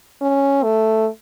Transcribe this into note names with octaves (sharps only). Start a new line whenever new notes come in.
C#4
A3